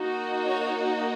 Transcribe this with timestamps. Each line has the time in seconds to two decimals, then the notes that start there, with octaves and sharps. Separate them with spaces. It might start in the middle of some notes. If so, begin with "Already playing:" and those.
Already playing: A#3 D#4 F#4
0.48 C#5